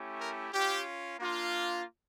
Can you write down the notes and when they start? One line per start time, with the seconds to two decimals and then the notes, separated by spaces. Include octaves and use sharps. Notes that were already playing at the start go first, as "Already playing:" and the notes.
Already playing: A3 C#4 E4 G4
0.20 A#4
0.52 C#4 F4 G4
1.18 A#3 D4 F4